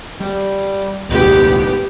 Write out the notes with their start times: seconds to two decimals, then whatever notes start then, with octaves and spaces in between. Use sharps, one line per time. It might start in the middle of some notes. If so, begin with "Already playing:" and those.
0.20 G3
1.10 D#1 C2 G#2 B3 G4